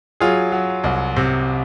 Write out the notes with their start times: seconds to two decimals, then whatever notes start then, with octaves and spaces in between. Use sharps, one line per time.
0.20 F#3 F4 G#4
0.52 F#3
0.84 C2
1.17 C3